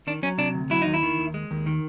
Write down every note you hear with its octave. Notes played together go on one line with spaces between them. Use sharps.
D#3 D4
F#3 C#4
C3 D4
D2
F#3 E4
D#2 D#4
E4
D#3
D#2
G#3
D#2
D#3